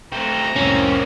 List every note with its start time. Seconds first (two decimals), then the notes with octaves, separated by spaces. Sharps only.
0.12 A3 C4 G5 A#5
0.56 C2 F2 A2 A#3 C4 C#4